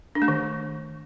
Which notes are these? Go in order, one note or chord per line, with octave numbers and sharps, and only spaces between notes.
D4
A3
D#3